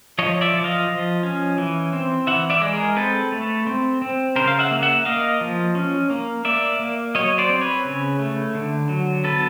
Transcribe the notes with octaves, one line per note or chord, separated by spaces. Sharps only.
F3 C#5 D#5
D5 E5
F3
D#5 F5
F3
C#4
E3
C4
E3 E5 F#5
D5 E5
G#3
G#4 A#4
C4 A4 B4
A3
C4
C4
C#3 A#4 C5
F5
E5 F#5
A#3
E5 F#5
A#3 D#5 F5
F3
C#4
A#3
A#3 D5 E5
A#3
F#3 C#5 D#5
C5 D5
C4
B4 C#5
C#3
A3
D3
F#3
B3 A4 B4